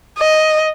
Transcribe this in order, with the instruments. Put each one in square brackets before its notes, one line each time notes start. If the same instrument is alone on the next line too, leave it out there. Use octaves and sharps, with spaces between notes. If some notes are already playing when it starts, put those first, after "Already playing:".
[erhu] D#5